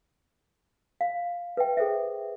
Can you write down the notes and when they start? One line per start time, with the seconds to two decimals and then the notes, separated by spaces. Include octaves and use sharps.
1.01 F5
1.57 B4 E5 G5
1.77 G#4 A4 C5 E5